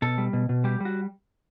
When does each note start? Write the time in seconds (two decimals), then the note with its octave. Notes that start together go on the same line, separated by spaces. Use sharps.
0.02 B2 A4
0.18 G3
0.33 B2
0.49 B2
0.64 G3 G4
0.81 G3 F#4